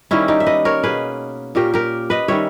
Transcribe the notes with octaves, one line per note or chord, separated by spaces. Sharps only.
D#3 G3 A#3 C#4 E4
D#4 G4
E5
B4 D#5
A#4 C#5
B2 A#3 C#4 G#4 B4
A#2 A#3 C#4 G4 A#4
G4 A#4
B4 D#5
D#3 G3 C#4 C#5 E5